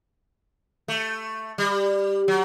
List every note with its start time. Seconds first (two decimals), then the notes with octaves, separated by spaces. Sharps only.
0.88 A3
1.58 G3
2.28 F#3